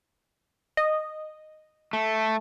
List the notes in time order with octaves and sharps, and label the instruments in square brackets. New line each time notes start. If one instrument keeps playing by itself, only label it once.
[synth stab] D#5
[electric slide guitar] A3